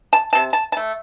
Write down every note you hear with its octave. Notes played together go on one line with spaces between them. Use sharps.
A5
C3 A5
A5
A5
A3